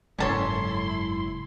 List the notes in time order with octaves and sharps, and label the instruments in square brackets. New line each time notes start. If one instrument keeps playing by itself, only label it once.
[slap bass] F#1 G#2 F#3 [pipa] C#4 A4 C#5 [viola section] E4 C6